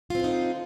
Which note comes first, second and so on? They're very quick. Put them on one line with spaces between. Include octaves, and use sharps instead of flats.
F4 C4 D3 D#4